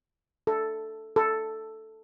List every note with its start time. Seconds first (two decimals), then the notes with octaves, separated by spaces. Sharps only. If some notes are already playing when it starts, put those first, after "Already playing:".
0.47 A4
1.16 A4